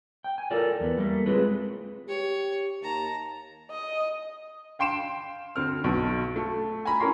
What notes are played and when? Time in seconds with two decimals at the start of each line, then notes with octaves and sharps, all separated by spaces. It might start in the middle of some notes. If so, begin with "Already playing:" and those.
0.24 G5
0.38 G#5
0.51 F4 A4 A#4 D5
0.80 E2 B3
0.98 G3 A3 A#3
1.26 G#3 C4 F4 G#4 B4
2.08 G4 C#5
2.82 D#2 A5 A#5
3.71 D#5
4.79 F5 G5 C6 D7 E7
5.56 D2 C4 F6
5.84 B1 B2
6.36 A3
6.85 G#5 A#5 B5
7.00 C#4 E4 A#4 G#5 A#5 C6